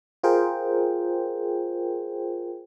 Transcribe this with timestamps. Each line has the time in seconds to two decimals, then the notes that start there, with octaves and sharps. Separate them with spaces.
0.23 F4 G#4 A#4 C5 G5